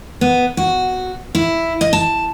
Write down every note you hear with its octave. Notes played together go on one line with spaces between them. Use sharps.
B3
F#4
E4
D#5
A5